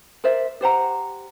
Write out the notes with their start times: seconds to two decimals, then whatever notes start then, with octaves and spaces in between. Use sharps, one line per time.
0.24 A#4 C5 D5 E5
0.61 G4 C5 F#5 A#5